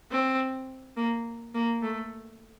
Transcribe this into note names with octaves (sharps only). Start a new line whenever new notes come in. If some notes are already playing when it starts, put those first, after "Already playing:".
C4
A#3
A#3
A3